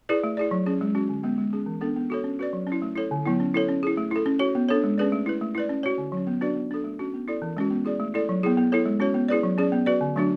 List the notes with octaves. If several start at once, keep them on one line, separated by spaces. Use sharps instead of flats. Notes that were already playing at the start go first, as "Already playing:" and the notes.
E4 G#4 B4 D5
A3
E4 G#4 D5
F#3
C#4 G#4
G#3
C#4 F#4
D3
G#3 B3
G#3
C#4 G#4
E3
B3 D4 A4
B3
F#4 A4 C#5
C#4
F#4 B4 D5
F#3
C#4
E4
A3
E4 A4 C#5
D3
F#3 B3 E4
C#4
E4 A4 C#5
C#4
E4 G#4
A3
E4 A4
C#4
F#4 C#5
B3
D4 A4 C#5
G#3
C#4 G#4 B4 D5
A3
E4 B4
A3
E4 B4 D5
C#4
F#4 C#5
D3
F#3 C#4
B3
D4 F#4 B4 D5
B3
D4 A4
A3
C#4 F#4
B3
E4 A4 D5
E3
G#3 C#4 F#4
B3
E4 G#4 D5
A3
E4 A4 D5
F#3
B3 E4 G#4
B3
E4 A4 C#5
G#3
C#4 F#4 C#5
B3
E4 G#4 B4 D5
F#3
C#4 G#4 D5
B3
F#4 B4 D5
D3
F#3 A3 D4 F#4